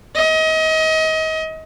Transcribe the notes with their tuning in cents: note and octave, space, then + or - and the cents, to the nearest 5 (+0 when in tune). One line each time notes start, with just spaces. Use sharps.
D#5 +30